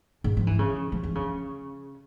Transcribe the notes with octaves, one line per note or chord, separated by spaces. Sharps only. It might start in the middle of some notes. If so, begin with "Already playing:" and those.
G#2
F3
E3
C#3
F3
E3
C#3